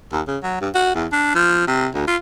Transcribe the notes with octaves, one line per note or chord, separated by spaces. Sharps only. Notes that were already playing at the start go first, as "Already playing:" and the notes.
D#2
C#3
F#3
G2
F#4
E2
D4
F3
C3
D2
F4